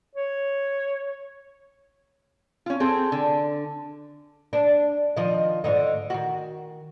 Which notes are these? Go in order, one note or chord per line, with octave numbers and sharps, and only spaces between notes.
C#5
C#4 F4
C4 G#4 A4
D3
D4
D#3 F3 D#5
G#2 D3 D#5
D#3 F#4